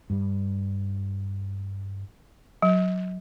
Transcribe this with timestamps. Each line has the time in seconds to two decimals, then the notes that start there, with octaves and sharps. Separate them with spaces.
0.10 G2 G3
2.62 F#3